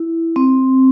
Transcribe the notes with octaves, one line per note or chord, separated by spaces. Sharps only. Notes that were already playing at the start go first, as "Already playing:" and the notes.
Already playing: E4
C4